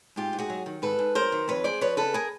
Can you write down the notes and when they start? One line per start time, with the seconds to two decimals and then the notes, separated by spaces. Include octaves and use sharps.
0.16 G#2 F4 G4
0.33 G#2
0.39 F#4 G#4
0.50 F#3
0.66 D#3
0.82 G#2 A4 B4
0.99 G#2
1.15 F#3 A#4 C5
1.32 D#3
1.48 F2 B4 C#5
1.64 G#3 C5 D5
1.81 F3 B4 C#5
1.97 C#3 A4 B4
2.14 G#4 A#4